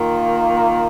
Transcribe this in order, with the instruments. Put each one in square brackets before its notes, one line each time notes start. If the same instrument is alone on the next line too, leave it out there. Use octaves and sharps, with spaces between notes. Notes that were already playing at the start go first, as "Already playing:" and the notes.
Already playing: [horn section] D#3 A#3 F4